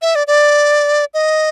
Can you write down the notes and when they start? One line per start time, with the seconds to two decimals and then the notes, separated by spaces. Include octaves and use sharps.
0.02 E5
0.15 D5
0.27 D5
1.14 D#5